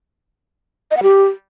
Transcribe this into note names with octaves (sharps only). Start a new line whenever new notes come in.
D#5
F#5
G4